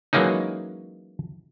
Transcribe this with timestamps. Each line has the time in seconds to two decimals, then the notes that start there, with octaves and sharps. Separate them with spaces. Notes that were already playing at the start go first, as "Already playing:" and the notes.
0.13 E3 F#3 G#3 A#3 C#4 D#4